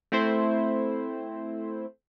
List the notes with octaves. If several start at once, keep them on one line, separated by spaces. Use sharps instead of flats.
A3 C4 E4 C5